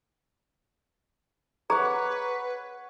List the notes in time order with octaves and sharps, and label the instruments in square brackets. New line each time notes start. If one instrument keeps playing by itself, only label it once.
[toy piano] G#4 A#5 [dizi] B4 [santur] C#5 F#5